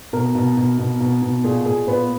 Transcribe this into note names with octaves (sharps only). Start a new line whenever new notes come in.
B2 A#4
B2
B2
B2
B2
B2
A#2 G#4
A#2 G#4
A#2 B3